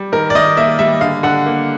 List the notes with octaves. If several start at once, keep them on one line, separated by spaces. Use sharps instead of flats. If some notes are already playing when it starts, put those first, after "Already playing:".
Already playing: G3
D#3 A#4
D5
D#3 D#5
A#3 E5
G3 E5
D3 F5
D3 F#5
A#3